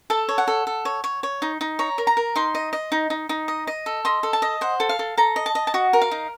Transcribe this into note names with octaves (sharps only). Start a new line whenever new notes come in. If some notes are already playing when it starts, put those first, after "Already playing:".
A4 A5
C#5
F#5
A4
A4
C#5
C#5
C#5
D#4
D#4
C#5 A#5
A#4
A#5
A#4
D#4 C6
D#5
D#5
D#4
D#4
D#4
D#5
D#5
A4
D#5 C6
A4
A5
D#5
C5 F#5
A4
F5
A4
A4 A#5
D#5
A5
D#5
A5
F#4 F#5
A#4
F5
D#4